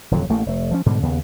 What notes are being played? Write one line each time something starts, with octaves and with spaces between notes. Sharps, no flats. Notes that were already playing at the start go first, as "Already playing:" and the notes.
D#1 F2 D3 F#3
A1 A3 A#3
F1 A3
F3 F#3 C#4
G#2 B2 D3 G3
D#2 C#3 B3